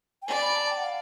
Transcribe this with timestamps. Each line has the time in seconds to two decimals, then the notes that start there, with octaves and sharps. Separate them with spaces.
0.22 G5
0.27 D5 G#5
0.41 B5
0.56 A5
0.70 G5
0.77 F#5
0.84 F5